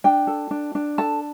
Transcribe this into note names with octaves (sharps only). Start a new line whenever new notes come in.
D4 G5
A4
D4
D4
A4 A5